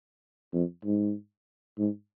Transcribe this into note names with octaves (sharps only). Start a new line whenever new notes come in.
F2
G#2
G#2